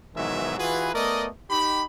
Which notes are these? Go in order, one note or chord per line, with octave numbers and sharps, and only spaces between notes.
G#2 B2 D#3 E3 F#3 E5
E3 F4 F#4 G#4 B4
A3 B3 A#4 D5 D#5
D#4 G4 B5